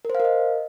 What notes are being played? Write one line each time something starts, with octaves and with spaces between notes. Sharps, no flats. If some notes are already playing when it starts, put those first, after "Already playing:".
A#4
C5
F5
A#4
D#5